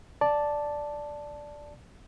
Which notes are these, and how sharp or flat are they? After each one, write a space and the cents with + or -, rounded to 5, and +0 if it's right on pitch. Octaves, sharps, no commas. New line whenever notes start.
D5 +0 A5 +0